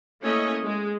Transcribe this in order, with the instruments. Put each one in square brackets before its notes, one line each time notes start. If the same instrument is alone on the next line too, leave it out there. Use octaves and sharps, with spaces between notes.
[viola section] A3 A#3 C#4 E4 C#5 D#5
G#3